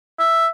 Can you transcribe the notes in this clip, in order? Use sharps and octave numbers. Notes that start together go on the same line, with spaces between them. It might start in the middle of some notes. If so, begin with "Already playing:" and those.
E5